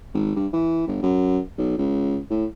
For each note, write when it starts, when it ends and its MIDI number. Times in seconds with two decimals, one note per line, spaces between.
0.14 0.34 32
0.36 0.47 43
0.53 0.85 52
0.87 1.00 31
1.02 1.39 42
1.58 1.76 35
1.78 2.18 37
2.30 2.45 45